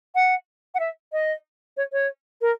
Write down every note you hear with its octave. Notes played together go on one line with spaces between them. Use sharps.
F#5
F#5
E5
D#5
C#5
C#5
A#4